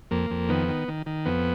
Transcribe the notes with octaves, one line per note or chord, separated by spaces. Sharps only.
F2 A#3
F2
D#3 B3
D#3
D#3
D#3
F2 B3